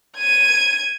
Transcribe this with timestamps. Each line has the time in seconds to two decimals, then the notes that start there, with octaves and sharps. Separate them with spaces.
0.18 G#6 D#7